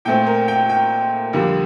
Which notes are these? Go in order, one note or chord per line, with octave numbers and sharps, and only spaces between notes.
A#2 A3 C4 G5
A#4
G5
G5
F2 D3 G3 A#3